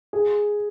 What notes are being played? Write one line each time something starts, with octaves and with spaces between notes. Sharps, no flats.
G#4